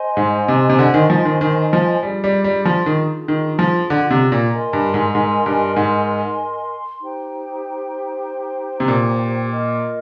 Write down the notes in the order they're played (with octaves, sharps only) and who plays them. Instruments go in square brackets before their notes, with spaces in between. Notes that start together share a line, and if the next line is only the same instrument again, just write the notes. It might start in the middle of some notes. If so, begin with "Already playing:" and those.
Already playing: [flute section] C5 D#5 G#5 C6
[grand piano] G#2
C3
C3
D3
D#3
F3
D#3
D#3
F3
[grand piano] G3 [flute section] D4 F4 G#4
[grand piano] G3
G3
F3
D#3
D#3
F3
D3
C3
A#2
[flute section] A#4 D#5 G#5 C6
[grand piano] G2
G#2
G#2
G2
G#2
[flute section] D#4 G4 C5 G5
[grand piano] C3
A#2
[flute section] F4 A#4 D#5